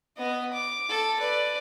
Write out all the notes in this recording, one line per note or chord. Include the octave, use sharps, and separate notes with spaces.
B3 D#5
D6
A4
B4 D5